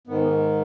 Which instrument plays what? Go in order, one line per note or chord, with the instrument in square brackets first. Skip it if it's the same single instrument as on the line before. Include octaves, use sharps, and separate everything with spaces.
[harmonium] G#2 D#3 B3